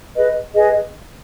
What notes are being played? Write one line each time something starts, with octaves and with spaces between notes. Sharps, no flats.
G#4 B4 D#5
G#4 B4 D#5